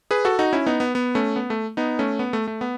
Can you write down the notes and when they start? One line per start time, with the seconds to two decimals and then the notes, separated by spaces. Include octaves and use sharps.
0.11 G#4 B4
0.25 F#4 A4
0.39 D#4 F#4
0.53 C#4 E4
0.66 B3 D#4
0.80 B3
0.95 B3
1.15 A3 C#4
1.36 B3
1.50 A3
1.77 B3 D#4
1.99 A3 C#4
2.19 B3
2.33 A3
2.47 A3
2.61 B3